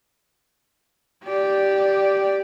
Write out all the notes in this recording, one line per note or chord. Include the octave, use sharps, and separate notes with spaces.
G4 D5